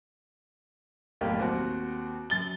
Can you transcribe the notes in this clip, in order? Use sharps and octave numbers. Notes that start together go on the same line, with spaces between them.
F1 B1 A2 A#3 G4 G5
D#2 C4 F#4
F#2 A6 G7